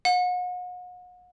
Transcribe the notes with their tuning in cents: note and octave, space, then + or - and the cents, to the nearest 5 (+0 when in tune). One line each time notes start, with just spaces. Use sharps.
F#5 -40